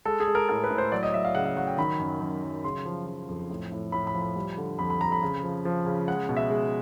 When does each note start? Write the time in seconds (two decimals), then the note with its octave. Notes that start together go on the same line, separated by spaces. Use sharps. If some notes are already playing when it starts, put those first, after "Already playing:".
0.05 G#3 A4
0.20 G#4
0.28 G#3
0.35 A#4
0.49 A2 A#4
0.64 B4
0.70 A2
0.78 C5
0.92 F#3 D5
1.03 D#5
1.13 F#3 E5
1.25 F5
1.35 C#3 F#5
1.46 F5
1.57 F#3 F#5
1.67 G5
1.78 D#3 B5
1.99 F#2
2.20 F#2
2.43 F#3
2.64 C#3 C6
2.86 F3
3.06 F3
3.29 F2
3.50 A2
3.72 A2
3.92 A2 B5
4.07 B5
4.14 F3
4.22 B5
4.36 G3
4.57 D3
4.79 F2 B5
4.90 B5
5.01 F2 A#5
5.12 B5
5.23 C#3
5.43 F3
5.65 F3
5.86 C#3
6.08 G#3 F#5
6.29 B2
6.37 E5
6.50 G#3